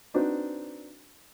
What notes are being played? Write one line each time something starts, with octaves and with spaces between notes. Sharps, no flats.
C4 D4 D#4 F#4 B4 C5